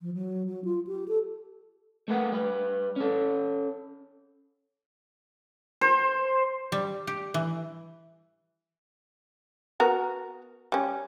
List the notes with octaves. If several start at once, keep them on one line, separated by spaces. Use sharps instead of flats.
F3
F#3
F#3
F4
G4
A4
A3 A#3 B4 F5 F#5
G3 B4
C#4 A4
C5
G3
G4
E3
B3 F#4 A#4
G3 C#4